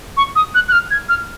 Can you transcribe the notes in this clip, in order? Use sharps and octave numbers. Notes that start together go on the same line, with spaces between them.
C#6
D#6
F#6
F#6
F6
G#6
F6